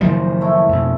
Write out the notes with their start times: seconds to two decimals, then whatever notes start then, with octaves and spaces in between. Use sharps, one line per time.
0.01 F#1 D#3 F3 G3 D#4 C5
0.41 A3 C#4 E4
0.69 F2 B2